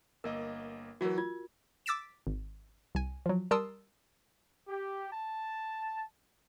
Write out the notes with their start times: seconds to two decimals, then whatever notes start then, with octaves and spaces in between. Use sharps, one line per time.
0.24 G1 A#3 A#4 D#5
1.01 E3 F#3 F#4 A#4
1.18 F4 G#6
1.86 D6 E6 A6 B6 D7 E7
2.27 G#1
2.95 C2 G#5
3.26 F3 F#3
3.51 G3 A#4 A5 C6 D#6 E6
4.67 G4
5.11 A5